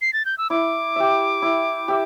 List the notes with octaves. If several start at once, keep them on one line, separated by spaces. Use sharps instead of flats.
C7
A6
G6
E6
E4 D6
G4 E5
E4
G4 E5